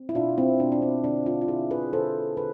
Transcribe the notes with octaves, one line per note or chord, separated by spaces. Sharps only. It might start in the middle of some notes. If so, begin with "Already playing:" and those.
Already playing: C4
E4
B2 D4 F4
C4 E4
B2 D4
D4
C4
D3 D4
D4 F4
F4
D3 E4 G#4
G#4 B4
D3 A4 C5
D3 G#4 B4